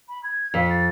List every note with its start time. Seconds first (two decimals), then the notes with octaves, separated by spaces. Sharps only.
0.08 B5
0.23 G#6
0.54 F2 B6
0.70 A6